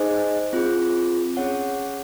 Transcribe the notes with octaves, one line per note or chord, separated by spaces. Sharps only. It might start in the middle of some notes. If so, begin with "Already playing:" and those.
Already playing: D#4 G#4 C5 D#5 G#5
C4 F4 G#4
C#4 G#4 C#5 F#5